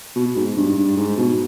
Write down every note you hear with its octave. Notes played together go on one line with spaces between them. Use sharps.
B2
G#2
G2
G2
G#2
B2